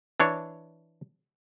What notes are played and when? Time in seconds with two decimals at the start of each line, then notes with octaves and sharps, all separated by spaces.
0.20 E3 D4 C#5